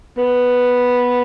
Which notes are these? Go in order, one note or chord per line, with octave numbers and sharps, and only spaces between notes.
B3